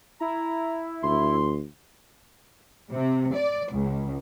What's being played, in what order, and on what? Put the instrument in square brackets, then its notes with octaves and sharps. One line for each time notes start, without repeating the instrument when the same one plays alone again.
[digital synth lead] E4 [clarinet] A#5
[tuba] D2 [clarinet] C6
[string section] C3
D5
C#2